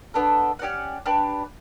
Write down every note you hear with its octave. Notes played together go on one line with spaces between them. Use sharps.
B3 D4 A4
C#4 G4 D5 F#5
D4 G4 B4